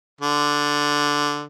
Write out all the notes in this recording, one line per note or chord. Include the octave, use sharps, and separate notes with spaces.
D3